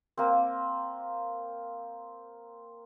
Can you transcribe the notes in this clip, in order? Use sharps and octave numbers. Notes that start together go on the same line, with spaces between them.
A#3 C4